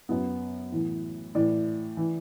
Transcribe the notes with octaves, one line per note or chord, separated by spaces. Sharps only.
F#2 F#3 B3
A2 E3
A2 E3 D5
E3